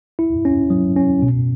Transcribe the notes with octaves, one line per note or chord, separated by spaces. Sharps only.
E4
C#4
F#3
C#4
B2